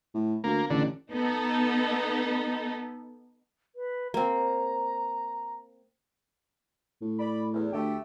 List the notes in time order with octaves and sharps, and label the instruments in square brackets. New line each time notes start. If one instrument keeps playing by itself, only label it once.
[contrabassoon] A2
[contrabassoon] D2 [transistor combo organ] A#3
[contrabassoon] A1 [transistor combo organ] D3
[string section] B3 D#4 A4
[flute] B4
[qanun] A#3 C4 [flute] A#5
[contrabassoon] A2
[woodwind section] D5 B5
E2
[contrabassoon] D2 [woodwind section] A3 G4